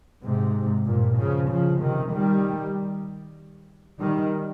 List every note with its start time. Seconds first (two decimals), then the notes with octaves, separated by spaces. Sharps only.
0.23 G#2 C3
0.85 G2 A#2
1.17 C#3 F3
1.49 C#3 F3
1.80 C3 D#3
2.12 D#3 G3
4.00 D#3 G3